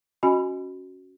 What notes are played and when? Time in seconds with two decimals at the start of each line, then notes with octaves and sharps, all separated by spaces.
0.23 C#4 F#4 D#5 G#5 B5